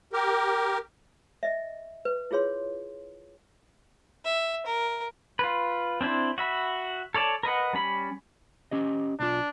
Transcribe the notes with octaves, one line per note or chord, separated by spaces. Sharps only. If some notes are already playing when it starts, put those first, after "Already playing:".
G4 A#4
D#5 E5
B4
E4 F4 G#4 C#5 C6
E5
A#4
F4 B4
C4 D4 E4 C5
F#4 E5 B5
A4 C#5 D5 A5
A#4 B4 D#5 F#5
G3 C#4 B5
C#4 G4 D#5
B1 D4 F4